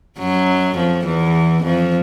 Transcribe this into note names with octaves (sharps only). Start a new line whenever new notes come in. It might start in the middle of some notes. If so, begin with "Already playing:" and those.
F#2 F#3
F2 F3
E2 E3
F2 F3